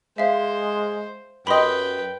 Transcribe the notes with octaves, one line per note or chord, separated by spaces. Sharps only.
G#3 C5 E5 F5
F#2 G4 B4 D#5 G5 B5 C6